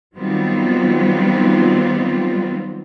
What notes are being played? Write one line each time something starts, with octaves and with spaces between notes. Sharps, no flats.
D#3 F#3 G3 B3 C4 F4